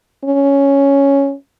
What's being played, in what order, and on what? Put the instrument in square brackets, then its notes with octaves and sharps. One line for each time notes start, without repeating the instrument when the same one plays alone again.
[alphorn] C#4